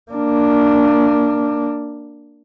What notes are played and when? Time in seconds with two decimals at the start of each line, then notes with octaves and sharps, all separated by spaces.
0.11 A#3 D4